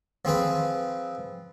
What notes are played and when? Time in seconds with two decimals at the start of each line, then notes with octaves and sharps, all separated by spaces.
0.25 F3 C4 G#4 B4